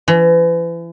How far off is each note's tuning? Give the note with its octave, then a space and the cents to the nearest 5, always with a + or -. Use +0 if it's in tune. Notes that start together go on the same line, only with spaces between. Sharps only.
E3 +35